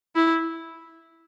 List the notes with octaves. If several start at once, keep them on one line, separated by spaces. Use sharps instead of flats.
E4